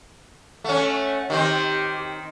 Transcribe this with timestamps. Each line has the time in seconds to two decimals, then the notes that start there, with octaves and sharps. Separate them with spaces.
0.64 A3 C#4 F#5
1.30 D#3 C4 G4